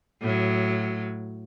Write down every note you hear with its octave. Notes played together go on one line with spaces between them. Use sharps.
A2 F#3